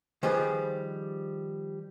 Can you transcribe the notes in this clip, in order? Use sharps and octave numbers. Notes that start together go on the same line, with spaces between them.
D#3 F3 G3 G4 G#4 B4